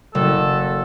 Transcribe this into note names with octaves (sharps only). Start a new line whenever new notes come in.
F#1 A4